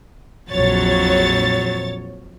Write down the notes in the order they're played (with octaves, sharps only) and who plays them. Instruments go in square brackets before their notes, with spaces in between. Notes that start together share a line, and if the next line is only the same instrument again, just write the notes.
[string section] A#1 C#5 A6 [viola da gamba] F2 F#3